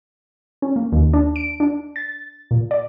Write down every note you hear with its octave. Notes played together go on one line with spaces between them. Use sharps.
C#4
A#3
D#2
D4
D7
D4
A6
A#2
D5